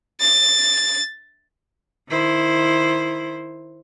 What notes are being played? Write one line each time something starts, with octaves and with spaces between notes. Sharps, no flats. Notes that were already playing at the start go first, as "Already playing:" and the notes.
A6
D#3 E4 C5